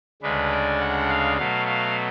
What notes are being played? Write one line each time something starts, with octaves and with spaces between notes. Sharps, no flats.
D2 C#3 G#3 D4 B4
D5
F#5
F5
B2 F#3 A3 F5
F5